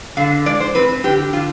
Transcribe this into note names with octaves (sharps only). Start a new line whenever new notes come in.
D3 F5
G#3 D5
C5
C4 B4
D3 G4
D3 F4